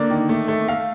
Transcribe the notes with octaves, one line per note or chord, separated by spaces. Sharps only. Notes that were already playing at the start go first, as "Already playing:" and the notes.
Already playing: D3 A#3 D5
D#3
A3
A3
A3 F5